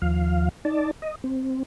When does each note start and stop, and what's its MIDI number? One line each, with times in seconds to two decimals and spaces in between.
0.02 0.49 39
0.02 0.49 53
0.02 0.49 77
0.65 0.91 63
0.65 0.91 74
0.65 0.91 81
1.02 1.15 75
1.24 1.63 60